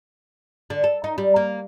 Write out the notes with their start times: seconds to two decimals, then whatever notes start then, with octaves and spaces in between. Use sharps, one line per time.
0.70 D3
0.84 A4
1.04 D#4
1.18 G3
1.36 A#3